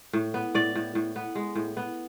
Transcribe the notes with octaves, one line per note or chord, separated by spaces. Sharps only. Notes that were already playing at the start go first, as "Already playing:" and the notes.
A2
B3
A2 D5
A2
A2
B3
G#3
A2
B3